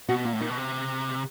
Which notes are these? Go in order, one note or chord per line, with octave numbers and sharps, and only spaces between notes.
B2 F#4
A#2 F4
A2
A#2 D#4
B2
C3